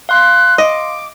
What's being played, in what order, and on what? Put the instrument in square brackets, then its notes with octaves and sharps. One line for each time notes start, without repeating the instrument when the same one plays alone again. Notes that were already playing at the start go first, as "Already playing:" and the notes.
[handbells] F5 C6 [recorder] F#6
[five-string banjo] D#5 [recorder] D6